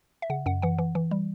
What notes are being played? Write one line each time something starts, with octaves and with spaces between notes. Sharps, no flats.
E5
C#3 F#5
F#2 F#5
E3 F#5
E3
E3
G3